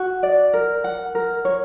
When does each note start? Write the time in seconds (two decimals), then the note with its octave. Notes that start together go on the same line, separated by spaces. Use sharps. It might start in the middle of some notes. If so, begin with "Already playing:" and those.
Already playing: F#4
0.23 D5
0.53 A#4
0.84 F#5
1.15 A#4
1.45 C#5